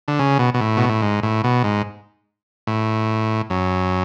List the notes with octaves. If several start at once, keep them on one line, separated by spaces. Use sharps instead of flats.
D3
C#3
B2
B2
A2
B2
A2
G#2
A2
B2
G#2
A2
F#2